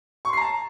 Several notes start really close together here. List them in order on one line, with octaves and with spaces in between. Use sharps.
C#6 C6 C7 A#5 A5